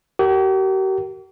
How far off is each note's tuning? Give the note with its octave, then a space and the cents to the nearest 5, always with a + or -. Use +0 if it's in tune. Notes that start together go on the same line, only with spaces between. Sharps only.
G4 -45 A#4 -20